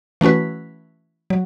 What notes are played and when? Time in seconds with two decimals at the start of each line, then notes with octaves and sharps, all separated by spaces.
0.21 E3 A3 C#4 F#4 B4
1.30 F#3